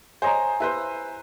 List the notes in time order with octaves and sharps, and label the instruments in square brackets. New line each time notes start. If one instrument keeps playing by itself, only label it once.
[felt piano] C5 C#5 D#5 [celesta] G#5 A#5
[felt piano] E4 B4 C5